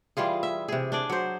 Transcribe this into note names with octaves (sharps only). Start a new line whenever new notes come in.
E3 G3 F4 G#4
E5
C3 G#4
D4 G#4 D5
F#3 C5